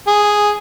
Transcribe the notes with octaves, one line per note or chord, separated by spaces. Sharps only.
G#4